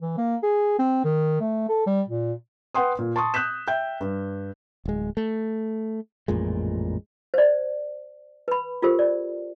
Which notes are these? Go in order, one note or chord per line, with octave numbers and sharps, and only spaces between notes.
E3
A#3
G#4
C4
D#3
A3
A4
G3
A#2
B4 F#5 G5 C6 D#6
A#2
A5 C6 C#6 D#6
D#6 F#6 G6 B6 E7
E5 G5 G6
G2
D1 G#3
A3
A1 F2 A#2 G#3
C5 D5
B4 B5
F4 G4 A4 A#4 C5
D5